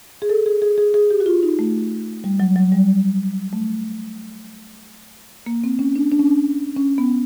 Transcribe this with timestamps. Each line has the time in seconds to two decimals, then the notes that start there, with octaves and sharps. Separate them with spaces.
0.22 G#4
0.29 A4
0.46 G#4
0.62 G#4
0.78 G#4
0.94 G#4
1.10 G4
1.20 F#4
1.26 F4
1.43 D#4
1.59 A3
2.24 G3
2.40 F#3
2.56 F#3
2.72 G3
3.53 A3
5.46 A#3
5.64 C4
5.79 C#4
5.96 D4
6.12 D4
6.19 C#4
6.27 D4
6.76 C#4
6.98 B3